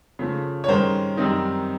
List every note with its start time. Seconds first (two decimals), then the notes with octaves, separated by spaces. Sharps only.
0.19 C#3 F3 A3
0.64 C#5
0.68 G2 D#3 G#3 C#4 A#4 C5
1.17 F#2 D#3 G3 C4 D#4